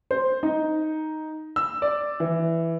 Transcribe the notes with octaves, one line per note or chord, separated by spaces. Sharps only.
C5
D#4
E6
D5
E3